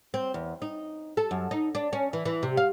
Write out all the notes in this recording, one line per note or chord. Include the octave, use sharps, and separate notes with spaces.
C4
E2
D#4
A4
F#2
D#4
D4
C#4
E3
E3
C3
F5